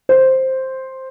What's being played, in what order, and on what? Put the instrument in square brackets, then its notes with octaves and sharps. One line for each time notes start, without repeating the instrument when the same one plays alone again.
[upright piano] C5